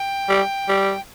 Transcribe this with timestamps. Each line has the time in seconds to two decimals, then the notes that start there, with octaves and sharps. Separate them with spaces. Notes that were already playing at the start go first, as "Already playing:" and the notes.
Already playing: G5
0.29 G3
0.68 G3